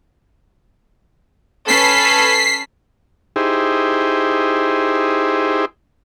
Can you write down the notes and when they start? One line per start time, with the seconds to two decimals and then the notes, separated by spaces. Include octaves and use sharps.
1.68 C#4 A4 B4 B6 C7
3.36 D#4 E4 G4 G#4 C5